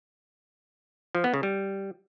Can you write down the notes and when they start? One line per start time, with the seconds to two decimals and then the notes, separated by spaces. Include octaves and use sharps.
1.15 F3
1.24 B3
1.34 C#3
1.43 G3